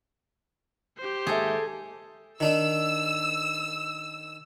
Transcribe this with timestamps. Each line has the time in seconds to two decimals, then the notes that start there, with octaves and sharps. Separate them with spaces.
0.98 G4 C5
1.27 D#2 G#2 G#4 A4 E5
2.40 D#3 D4 D#4 E6